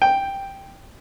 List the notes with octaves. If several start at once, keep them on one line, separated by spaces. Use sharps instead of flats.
G5